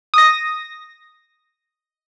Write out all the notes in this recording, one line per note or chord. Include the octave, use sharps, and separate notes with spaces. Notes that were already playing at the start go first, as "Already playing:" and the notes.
D#6 A#6